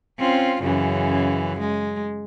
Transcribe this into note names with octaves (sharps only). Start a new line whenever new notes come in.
C4 C#4 F4
F#2 C#3 E3
G#3